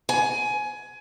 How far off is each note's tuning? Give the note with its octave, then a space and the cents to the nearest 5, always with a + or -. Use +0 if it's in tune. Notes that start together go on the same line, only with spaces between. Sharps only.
G#5 +20